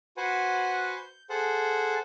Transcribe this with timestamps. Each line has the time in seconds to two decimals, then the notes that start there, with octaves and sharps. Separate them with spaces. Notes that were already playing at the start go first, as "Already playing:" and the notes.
0.17 F#4 B4 C5 F#5 G#5
0.96 G6
1.30 G#4 A4 C5 F#5